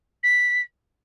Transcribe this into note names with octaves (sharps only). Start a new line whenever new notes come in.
B6